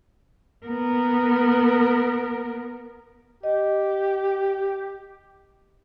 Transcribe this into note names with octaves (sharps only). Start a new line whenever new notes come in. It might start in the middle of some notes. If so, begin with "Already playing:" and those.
B3 A#4
G4 D#5